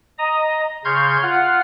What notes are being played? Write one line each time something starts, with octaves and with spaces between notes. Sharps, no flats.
D#5 A#5 D#6
C#3 C#5 C6 F6 G6 G#6
F4 F#5 F6